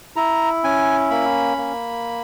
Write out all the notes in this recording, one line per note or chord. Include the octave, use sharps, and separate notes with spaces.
E4 A#5
C#4 G#5
A#3 B5
A#3